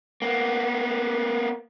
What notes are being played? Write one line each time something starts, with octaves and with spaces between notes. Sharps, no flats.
A#3 B3